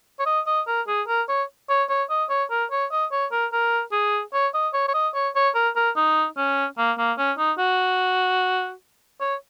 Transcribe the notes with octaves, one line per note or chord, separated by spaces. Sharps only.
C#5
D#5
D#5
A#4
G#4
A#4
C#5
C#5
C#5
D#5
C#5
A#4
C#5
D#5
C#5
A#4
A#4
G#4
C#5
D#5
C#5
C#5
D#5
C#5
C#5
A#4
A#4
D#4
C#4
A#3
A#3
C#4
D#4
F#4
C#5